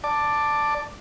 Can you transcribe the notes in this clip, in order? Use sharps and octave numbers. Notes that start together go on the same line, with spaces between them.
D5 A5 D6